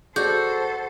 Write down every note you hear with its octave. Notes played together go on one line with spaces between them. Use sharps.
F#4 G#4 A4 C5 D5 G6